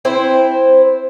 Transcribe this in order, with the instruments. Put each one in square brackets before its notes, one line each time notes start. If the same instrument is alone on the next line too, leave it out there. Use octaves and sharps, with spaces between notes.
[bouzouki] C4 E4 C5